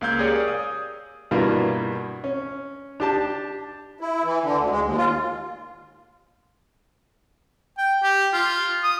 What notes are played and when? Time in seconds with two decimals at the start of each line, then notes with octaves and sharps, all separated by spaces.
0.01 C#2 A#3 F5 E6 G6 G#6
0.19 G4 G#4 A#4 C#5 D5 F5
0.48 D#6
1.31 G2 B2 G3 A#3 E4 F4
2.24 C#4
3.00 D4 G4 A5
4.01 E4
4.24 E3
4.43 D3
4.58 D2
4.70 G#3
4.85 D#2
4.98 F4
7.78 G5
8.03 G4
8.33 F4
8.83 D#6